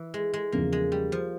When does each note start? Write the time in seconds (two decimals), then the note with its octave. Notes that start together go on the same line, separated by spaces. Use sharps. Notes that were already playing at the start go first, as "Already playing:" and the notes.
Already playing: E3
0.14 G#3
0.34 G#3
0.52 E2 C#3 F3 A#3
0.72 G#3
0.92 G3
1.12 F3